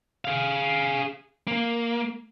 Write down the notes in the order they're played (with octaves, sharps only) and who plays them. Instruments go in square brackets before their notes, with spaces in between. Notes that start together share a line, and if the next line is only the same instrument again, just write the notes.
[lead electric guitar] G#4 F5
A#3